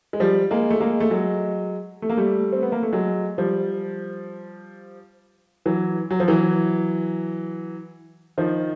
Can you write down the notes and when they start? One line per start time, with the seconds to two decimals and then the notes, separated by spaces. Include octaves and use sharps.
0.13 G#3
0.20 F3 G3
0.51 G#3 A#3
0.70 A3
0.81 G#3 A#3
1.00 A3
1.11 F#3 G#3
2.02 A3
2.10 A#3
2.17 G3 A3
2.53 C4
2.63 B3
2.72 A#3
2.83 A3
2.93 F#3 G#3
3.38 F3 G3
5.66 E3 F#3
6.11 F#3
6.20 F3
6.28 E3 F#3
8.38 D#3 F3